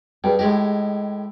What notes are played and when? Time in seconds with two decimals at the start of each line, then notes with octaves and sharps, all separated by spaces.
0.24 G2 G#4 D#5 G5
0.39 A2 G#3 G4 D#5